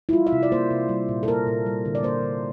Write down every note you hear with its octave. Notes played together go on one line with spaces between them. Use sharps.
E4
G3 F4
E5
C3
D5
A#3 C5
C3
G3
A#2
A4
A#3 A#4
A#2
G3
D3
D5
A#3 C5
D3